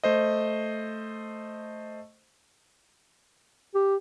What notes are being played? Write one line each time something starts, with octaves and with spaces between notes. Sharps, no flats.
A3 C5 D#5
G4